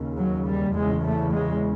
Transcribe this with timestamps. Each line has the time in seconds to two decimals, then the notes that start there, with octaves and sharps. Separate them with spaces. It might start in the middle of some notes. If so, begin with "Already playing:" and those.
Already playing: D#2 C#3
0.18 F#3
0.47 G3
0.75 E2 C#3 G#3
1.04 A3
1.32 G#3